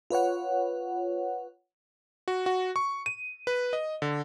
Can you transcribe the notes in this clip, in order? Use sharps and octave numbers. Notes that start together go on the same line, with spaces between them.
F4 B4 C#5 F#5
F#4
F#4
C#6
D#7
B4
D#5
D3